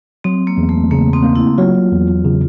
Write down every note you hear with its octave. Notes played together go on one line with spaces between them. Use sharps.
F#3 C4
A#3
E2
A3
C#3 A#3
C4
A#3
E4
F#3 F4
E2
C#3